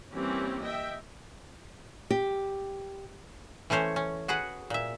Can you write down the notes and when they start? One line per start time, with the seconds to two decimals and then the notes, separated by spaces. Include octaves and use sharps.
0.14 E3 G3 A#3 C4 C#4 G4
0.64 D#5 E5 G5
2.11 G4
3.70 E3 A3 C#4 C5 C#5
3.96 C#4
4.28 F#4 G#4 B4 F#5
4.70 A#2 E5